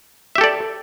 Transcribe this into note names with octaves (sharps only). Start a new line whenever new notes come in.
G4 A4 D5 E5